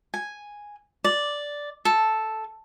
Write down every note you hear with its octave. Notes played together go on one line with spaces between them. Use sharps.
G#5
D5
A4